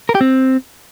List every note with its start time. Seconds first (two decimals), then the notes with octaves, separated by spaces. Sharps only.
0.09 A#4
0.15 G4
0.21 C4